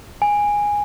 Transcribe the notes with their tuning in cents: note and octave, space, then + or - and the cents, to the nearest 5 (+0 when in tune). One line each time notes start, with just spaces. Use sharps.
G#5 -10